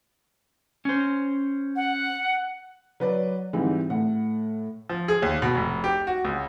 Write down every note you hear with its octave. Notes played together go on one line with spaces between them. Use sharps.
C#4 C5
F#5
F#3 B4 D5
G#2 E3 G3 C4
A2 F#5
F3
G#4
D#2
B2
F1
G4
F#4
C#2